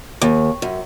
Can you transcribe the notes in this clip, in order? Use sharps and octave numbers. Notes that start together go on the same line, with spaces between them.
D#2
F#2